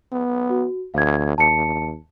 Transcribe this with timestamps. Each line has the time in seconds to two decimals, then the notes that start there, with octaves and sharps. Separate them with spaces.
0.12 B3
0.50 F#4
0.94 D2 F5 G#6
1.38 D#2 A5 C#7